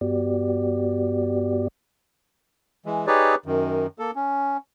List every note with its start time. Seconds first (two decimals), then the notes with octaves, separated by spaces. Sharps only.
0.01 G2 B3 F#4 G4 D5
2.86 E3 G#3
3.07 D#4 G4 G#4 B4 C#5 D5
3.46 F#2 D#3
3.99 A#3 A4
4.16 C#4